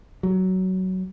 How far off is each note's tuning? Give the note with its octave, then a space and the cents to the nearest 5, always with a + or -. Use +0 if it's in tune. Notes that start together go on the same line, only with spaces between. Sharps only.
F#3 +15